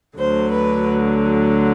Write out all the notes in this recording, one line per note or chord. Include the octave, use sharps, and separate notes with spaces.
D2 D3 F#3 C5
B4